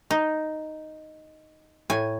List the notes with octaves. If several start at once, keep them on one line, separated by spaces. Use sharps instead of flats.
D#4
A2 G#5